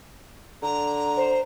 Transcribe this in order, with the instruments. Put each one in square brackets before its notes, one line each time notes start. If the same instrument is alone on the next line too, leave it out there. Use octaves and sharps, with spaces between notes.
[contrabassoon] D3 [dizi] A#5
[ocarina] C5